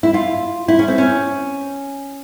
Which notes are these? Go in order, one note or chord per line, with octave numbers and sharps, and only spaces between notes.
E4
F4
E4
C#4
C4
C#4